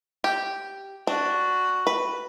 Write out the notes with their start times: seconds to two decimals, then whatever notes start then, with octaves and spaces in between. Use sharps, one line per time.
0.24 G4
1.07 D4 F#4
1.87 B4